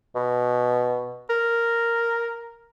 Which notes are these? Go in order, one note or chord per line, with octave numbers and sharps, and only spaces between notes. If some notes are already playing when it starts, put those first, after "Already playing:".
B2
A#4